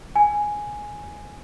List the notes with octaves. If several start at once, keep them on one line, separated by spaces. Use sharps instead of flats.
G#5